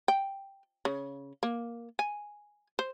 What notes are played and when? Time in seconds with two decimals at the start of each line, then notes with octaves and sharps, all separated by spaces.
0.08 G5
0.85 C#3
1.43 A#3
1.99 G#5
2.79 C5